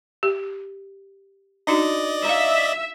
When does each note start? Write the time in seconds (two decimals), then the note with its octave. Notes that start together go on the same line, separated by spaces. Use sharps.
0.23 G4
1.67 D4 D#4 F#4 D5 D#5
2.25 E5 F5 A#5